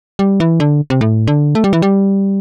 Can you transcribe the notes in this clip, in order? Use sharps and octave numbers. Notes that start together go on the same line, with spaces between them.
G3
E3
D3
C3
A2
D3
A3
G3
E3
G3